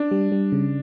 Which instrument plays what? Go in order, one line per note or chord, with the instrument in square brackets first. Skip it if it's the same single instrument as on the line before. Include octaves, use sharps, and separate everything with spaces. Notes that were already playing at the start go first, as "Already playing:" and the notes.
Already playing: [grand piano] D4
[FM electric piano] G3
G3
C#3